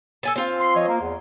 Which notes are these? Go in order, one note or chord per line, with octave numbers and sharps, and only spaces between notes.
A4 G#5 A5
C4 F4
C6
F3 C#5 D#5
A#3
E2